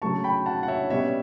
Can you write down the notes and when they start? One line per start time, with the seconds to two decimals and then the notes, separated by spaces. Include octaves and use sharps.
0.02 C#3 F#3 A3 A5 C#6
0.24 G5 B5
0.46 F#5 A5
0.63 F#5
0.68 C#5 E5
0.90 B2 G3 C#4 C#5 E5